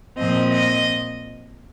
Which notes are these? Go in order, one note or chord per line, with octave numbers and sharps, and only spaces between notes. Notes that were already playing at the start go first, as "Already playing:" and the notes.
A#2 F3 C4 D#5
D#5